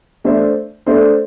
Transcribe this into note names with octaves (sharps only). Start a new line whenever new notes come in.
A3 D4 A4 C5 E5
A3 D4 A4 C5 E5